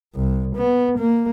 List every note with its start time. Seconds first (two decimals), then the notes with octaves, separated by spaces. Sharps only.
0.15 C2
0.56 B3
0.98 A#3